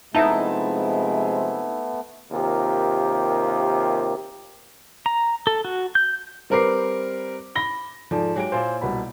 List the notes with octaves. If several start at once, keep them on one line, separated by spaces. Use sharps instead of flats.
C3 F3 G#3 A3 B3 D#4 E4 A5
D#2 C3 F4 G4 A#4
A#5
A4
F#4
G6
G3 C4 A#4 B4 D6 C7
B5 A#6 G7
G#2 F3 A4 D5 A5
F#3 G#3 A#3 G4 C#5 D7
A#2 E4 C5 D5 F5 G#5
C2 B2 B5